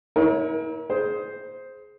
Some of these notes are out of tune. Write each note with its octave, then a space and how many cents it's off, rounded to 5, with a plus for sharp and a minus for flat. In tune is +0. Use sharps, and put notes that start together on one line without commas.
E4 -35 A#4 +35 C#5 +0
G#4 +20 C5 +0